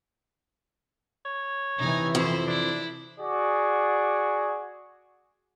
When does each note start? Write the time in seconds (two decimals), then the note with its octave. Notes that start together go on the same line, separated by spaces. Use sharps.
1.26 C#5
1.78 C3 E3 D#4 G#5
2.15 F2 E4 C5
2.48 D4 E4
3.19 F#4 G#4 D5